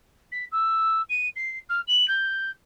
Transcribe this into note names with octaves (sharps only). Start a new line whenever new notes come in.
B6
E6
D#7
C7
F6
F#7
G6